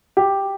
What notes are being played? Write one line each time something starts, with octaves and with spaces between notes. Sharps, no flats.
G4